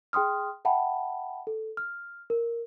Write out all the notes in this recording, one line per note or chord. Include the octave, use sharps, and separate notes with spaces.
G#4 G5 C6 D#6 F6
E5 F#5 G5 A5 B5
A4
F6
A#4